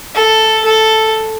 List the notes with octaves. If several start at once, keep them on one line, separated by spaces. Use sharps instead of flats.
A4
A4